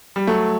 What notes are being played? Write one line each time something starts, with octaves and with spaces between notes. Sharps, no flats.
G3
F#3 A3